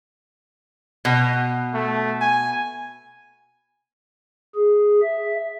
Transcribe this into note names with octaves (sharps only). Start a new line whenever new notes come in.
B2
A3
G#5
G#4
E5